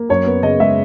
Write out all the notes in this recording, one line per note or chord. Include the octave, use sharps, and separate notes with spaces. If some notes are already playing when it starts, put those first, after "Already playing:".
Already playing: A#3
F#2 C#5
B3
C#3 D#5
G#3 E5